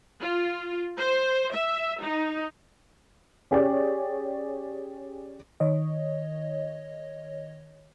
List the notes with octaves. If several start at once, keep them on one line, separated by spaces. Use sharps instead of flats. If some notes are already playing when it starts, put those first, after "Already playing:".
F4
C5
E5
D#4
C#4 G4 G#4 C#5 D5
D#3 C#5 D#5